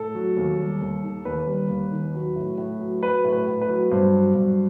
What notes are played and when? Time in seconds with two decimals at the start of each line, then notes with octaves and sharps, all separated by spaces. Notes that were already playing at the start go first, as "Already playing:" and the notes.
Already playing: A2 A4
0.15 F#3
0.37 D#2
0.58 G3
0.81 D#2
1.04 D#3
1.25 D#2 B4
1.47 G3
1.69 D#2
1.91 D#3
2.14 F#3
2.36 A2
2.58 A2
2.80 F#3
3.02 F#3 B4
3.24 A2
3.32 B4
3.47 A2
3.61 B4
3.69 F#3
3.91 G2 C5
4.13 F#3
4.35 G2